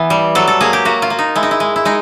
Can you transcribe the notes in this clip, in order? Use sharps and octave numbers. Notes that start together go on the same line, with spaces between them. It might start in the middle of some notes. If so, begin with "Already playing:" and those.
Already playing: E3 B3
G3
F#3 A4
A4
A#3 G#4
G4
A#3 F#4
F4
A#3
D#4
G#3 E4
D#4
E4
G#3
E4
G#3 D#4